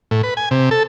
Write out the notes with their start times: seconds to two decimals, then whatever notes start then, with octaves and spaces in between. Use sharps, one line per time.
0.11 A2
0.23 B4
0.37 G#5
0.51 C3
0.71 A4